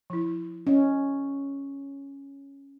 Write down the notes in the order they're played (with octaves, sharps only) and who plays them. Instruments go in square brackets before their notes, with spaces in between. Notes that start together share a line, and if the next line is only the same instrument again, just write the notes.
[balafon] F3 E4
[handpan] C#4 [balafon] D#5